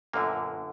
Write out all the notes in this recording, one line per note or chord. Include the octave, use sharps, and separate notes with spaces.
G1 F#2 A#2 D3 A#3